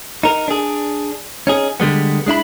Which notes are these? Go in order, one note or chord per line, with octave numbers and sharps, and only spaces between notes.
D#4 A#4
D4 G#4
C#4 D#4 G#4
D3 G3 G#3 B3
G#3 D4 E4 B5